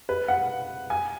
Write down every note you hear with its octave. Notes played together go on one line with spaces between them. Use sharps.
B4
F#5
G#5